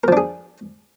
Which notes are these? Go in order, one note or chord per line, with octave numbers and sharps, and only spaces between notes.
F3 D4 G#4 A#4